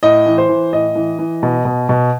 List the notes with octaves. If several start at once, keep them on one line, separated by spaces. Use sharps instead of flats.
A2 D#5
E3
C5
E3
A2 D#5
E3
E3
B2
B2
B2